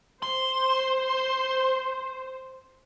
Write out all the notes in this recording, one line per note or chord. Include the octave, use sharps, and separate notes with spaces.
C5 C6